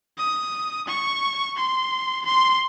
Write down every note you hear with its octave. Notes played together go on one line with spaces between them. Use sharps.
D#6
C#6
C6
C6